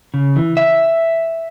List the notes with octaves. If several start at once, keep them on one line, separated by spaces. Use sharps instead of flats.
C#3
E3
E5